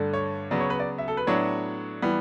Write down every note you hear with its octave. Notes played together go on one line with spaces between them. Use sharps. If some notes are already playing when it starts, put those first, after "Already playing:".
Already playing: G2 D3 A3 D4
C#5
C#3 F#3 B3 D5
C#5
B4
D5
E5
A4
B4
A2 F#3 B3 D4 C#5
E3 G3 B3